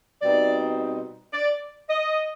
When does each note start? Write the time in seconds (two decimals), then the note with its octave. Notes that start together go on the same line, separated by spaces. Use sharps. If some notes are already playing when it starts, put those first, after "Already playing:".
0.22 B2 G3 C4 D#4 D5
1.33 D5
1.89 D#5